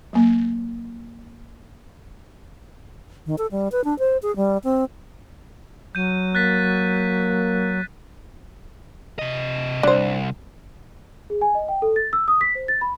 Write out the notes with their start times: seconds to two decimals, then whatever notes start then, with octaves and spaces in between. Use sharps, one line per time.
0.13 F#3 A#3
3.26 D#3
3.38 A4
3.51 G3
3.72 B4
3.84 D4
3.99 C5
4.22 G#4
4.36 G3
4.64 C4
5.95 F#3 G6 D#7
6.35 A#3 F#6 A6 B6
9.19 C3 D#5
9.83 C2 D4 C5
11.30 G#4
11.41 G#5
11.55 D#5
11.68 G5
11.82 A4
11.96 A6
12.13 E6
12.28 D#6
12.41 B6
12.55 C5
12.68 A6
12.81 B5